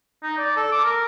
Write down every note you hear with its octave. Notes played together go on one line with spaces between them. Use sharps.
D#4
D5
A4
D6
A#4